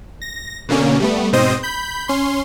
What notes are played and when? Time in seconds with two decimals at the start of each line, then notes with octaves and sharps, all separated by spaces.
0.22 A#6
0.69 B2 D3 A#3 C#4
1.00 G3 A3 B3
1.33 G#2 B2 C4 C5 D#5 D#6
1.63 B5 G6
2.08 C#4 C6